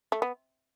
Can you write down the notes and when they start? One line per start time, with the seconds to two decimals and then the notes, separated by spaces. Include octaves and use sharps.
0.12 A3
0.22 B3